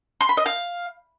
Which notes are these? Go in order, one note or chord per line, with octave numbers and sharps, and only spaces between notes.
C6
B5
D#5
F5